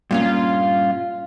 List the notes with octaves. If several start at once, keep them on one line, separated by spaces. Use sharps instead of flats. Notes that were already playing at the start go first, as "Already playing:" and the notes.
G2 A#2 C#4 F4